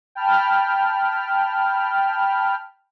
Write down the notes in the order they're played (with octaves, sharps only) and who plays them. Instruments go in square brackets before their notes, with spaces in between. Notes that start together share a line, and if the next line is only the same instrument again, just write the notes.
[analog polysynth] G5 A5 B5 F6